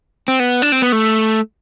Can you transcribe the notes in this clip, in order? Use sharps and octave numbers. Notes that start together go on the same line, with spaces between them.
C4
B3
D4
C4
B3
A3